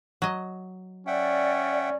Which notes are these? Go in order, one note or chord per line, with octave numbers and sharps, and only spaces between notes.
F#3 D#5
C#4 D5 E5 F#5 G5